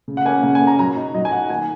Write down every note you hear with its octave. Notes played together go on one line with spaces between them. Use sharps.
C#3
F#5
A#3 C#4 G#5
C#3 F#5
G#5
A#3 C#4
A#5
F#3 A#5
D#4
F#3 D#5
G#5
D#4 F#5
D#3 G#5